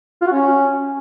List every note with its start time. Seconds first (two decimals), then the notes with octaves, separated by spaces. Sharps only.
0.22 F4
0.27 F#4
0.32 C#4